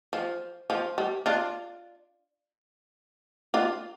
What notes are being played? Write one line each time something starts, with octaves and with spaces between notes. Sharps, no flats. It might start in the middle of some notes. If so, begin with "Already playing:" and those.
F3
F3
G3
D4 F4
D4 F4